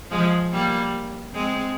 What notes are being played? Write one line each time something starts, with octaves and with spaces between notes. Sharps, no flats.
F3 G#3
G3 A#3
G#3 C4